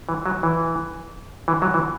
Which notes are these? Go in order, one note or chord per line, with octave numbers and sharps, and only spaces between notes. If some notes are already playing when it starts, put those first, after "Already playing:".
E3
F#3
E3
E3
F#3
E3